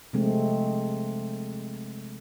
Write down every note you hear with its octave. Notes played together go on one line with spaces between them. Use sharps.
C3 F3 G#3 A3 C4